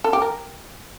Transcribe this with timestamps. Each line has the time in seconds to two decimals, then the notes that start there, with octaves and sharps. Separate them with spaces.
0.04 A4
0.13 G4
0.22 A#4